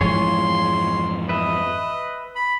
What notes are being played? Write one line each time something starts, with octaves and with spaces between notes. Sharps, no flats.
F2 G#2 E3 F4 G#4 C#5 C6
B4 D#5 E5
B5